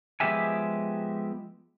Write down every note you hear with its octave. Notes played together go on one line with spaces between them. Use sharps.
F3 G#3 B3 G4 E5 G#5